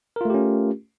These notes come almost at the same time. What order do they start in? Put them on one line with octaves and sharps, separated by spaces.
A#4 F4 A3 G4 C#4